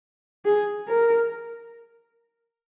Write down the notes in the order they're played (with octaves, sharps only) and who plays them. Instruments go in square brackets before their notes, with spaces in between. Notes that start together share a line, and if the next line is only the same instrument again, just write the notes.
[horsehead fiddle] G#4
A#4